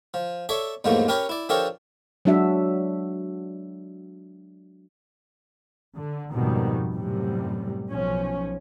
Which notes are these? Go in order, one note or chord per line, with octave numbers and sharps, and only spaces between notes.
F3
A4 C#5 D5 E5
E2 G#2 F3 F#3 A3 A#3
C#4 G4 A#4 B4 C#5
E4 D5
F3 D4 G4 A4 A#4 C#5
F#3 G#3 D4 F#4 E5
D3
F2 G#2 B2 D#3 F3 G3
F#2 A2 C3 G3
B1 F3 C#4